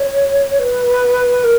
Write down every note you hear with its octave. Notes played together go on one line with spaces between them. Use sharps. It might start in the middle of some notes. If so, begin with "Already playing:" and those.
Already playing: C#5
B4
A#4